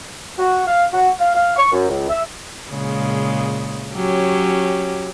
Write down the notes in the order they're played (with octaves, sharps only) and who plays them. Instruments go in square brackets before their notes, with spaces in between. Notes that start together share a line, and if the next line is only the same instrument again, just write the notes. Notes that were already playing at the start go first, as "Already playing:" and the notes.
[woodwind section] F#4
F5
F#4
F5
F5
C#6
F#2
C#2
E5
[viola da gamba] A#2 C#3 G#3
F#3 C#4 G4